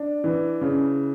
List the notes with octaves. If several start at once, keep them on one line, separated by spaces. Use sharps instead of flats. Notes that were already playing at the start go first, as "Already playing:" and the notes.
Already playing: D4
E3
C#3